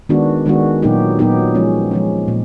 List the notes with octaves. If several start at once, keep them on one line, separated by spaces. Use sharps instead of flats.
D#3 G#3 B3 D4 F#4
D#3 G#3 B3 D4 F#4
A#2 F#3 B3 D#4 G4
A#2 F#3 B3 D#4 G4
F3 G#3 C#4
F3 G#3 C#4
A#2